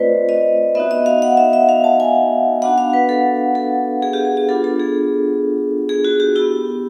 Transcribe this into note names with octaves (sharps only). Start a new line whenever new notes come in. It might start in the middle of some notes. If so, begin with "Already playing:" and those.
Already playing: A3 C4 F4 B4 C5 D5 D#5
D#5
B3 D#4 F#4 E5
D#5
F5
F#5
E5
E5
F5
A5
G#5
B3 D4 F#4 F#5
F5
B4
A4
A4
G#4
G4
G#4
G4
B3 D4 F4 A4
A4
G#4
G#4
F#4
G4
B3 E4 G4